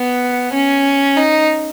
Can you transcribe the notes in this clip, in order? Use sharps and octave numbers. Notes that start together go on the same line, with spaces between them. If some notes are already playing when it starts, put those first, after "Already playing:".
Already playing: B3
C#4
D#4